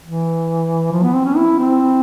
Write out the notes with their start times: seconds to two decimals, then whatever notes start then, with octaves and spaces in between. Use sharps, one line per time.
0.04 E3
0.92 F3
1.03 B3
1.14 C4
1.25 C#4
1.37 E4
1.59 C4